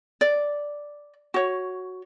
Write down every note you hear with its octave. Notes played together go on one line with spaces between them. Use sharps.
D5
F#4 C#5